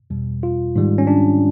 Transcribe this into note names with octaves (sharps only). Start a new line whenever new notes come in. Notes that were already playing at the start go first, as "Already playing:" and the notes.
E2 B2 G3
F4
G#2 D#3 G3
C#4
D4